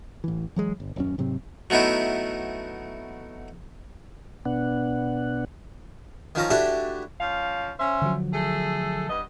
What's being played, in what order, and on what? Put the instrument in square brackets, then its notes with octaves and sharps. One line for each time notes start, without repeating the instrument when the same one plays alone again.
[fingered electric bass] A1 E3
E3 F#3 G#3
G1
D#1 F#2 C#4
G#2 C3 F#3 C4
[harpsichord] F#3 A3 B3 D#4 E4
[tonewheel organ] B2 B3 D4 F#5
[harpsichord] D#3 F3 C#4 A#5
A3 D4 E4 F#4 G4
[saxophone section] F3 C#4 F5
C#4 C5 E5
[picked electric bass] D3 F3 F#3
[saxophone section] A3 G#4 A4
G2 B3 D#5